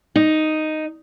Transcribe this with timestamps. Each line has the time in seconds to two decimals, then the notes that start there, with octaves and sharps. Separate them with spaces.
0.16 D#4